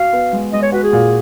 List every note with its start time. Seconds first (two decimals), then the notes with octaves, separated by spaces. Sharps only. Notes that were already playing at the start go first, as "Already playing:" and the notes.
Already playing: F#4 F5
0.13 B3
0.33 G#3
0.53 G#3 D#5
0.62 C#5
0.72 F#4 B4
0.83 G#4
0.93 A#2